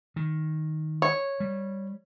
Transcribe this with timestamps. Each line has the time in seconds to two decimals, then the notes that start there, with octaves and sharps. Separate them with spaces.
0.16 D#3
1.02 C#5
1.40 G3